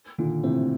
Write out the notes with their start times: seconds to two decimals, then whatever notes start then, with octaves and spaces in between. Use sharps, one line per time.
0.18 A#2 D3 D#3
0.43 A2 C3 C4